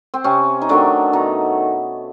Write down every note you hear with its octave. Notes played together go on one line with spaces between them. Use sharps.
C4
C3 C#4
D#4
D#3 F#3 A3 D4
B2 D#4